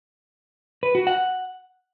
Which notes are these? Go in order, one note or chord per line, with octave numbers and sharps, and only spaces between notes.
B4
F#4
F#5